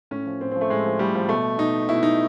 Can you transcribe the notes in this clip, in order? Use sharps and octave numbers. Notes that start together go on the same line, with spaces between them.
A2 C#4
F3
A2 C4
C4
F3
A3
A2 G#3
F3
A2 G3
F3
B2 A3
B2 D#4
B2 E4
D#4